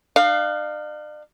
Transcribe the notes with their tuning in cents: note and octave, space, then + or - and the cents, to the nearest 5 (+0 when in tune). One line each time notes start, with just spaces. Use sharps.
D4 +45 F5 +0